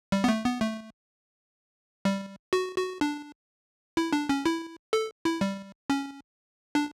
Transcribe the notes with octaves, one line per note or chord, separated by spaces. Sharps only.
G3
B3
A3
B3
A3
G3
F#4
F#4
D4
E4
D4
C#4
E4
A4
E4
G3
C#4
D4